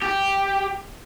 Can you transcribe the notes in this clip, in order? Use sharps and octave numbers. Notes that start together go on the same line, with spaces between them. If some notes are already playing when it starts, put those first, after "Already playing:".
G4